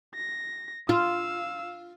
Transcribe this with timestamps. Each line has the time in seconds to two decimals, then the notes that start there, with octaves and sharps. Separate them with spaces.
0.15 A#6
0.89 F4 F5 E6